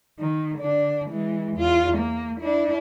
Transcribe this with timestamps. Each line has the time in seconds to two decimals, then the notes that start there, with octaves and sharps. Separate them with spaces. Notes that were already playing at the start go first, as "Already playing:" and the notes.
0.19 D#3
0.58 D3 D4
1.09 E3 G#3
1.57 E2 F4
1.98 A#3
2.41 D4 E4